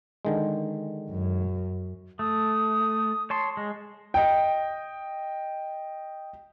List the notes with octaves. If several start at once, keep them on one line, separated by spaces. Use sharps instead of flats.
D3 D#3 G#3
F#2
A3 D#6
C#5 A5 C6
G#3
D#5 G5